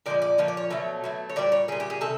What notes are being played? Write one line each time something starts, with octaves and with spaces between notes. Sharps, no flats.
A#2 F3 G#3 D5
D5
A#2 F3 C#5
D5
C#5
B2 F#3 A3
B2 F#3 A3
C#5
A#2 G3 D5
C#5
A#2 G3 G#4
G4
G#4
C3 D#3 A4